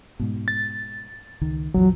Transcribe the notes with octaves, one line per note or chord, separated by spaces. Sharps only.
G#2 B2
A6
C#2 D#3
A#1 E2 F3 F#3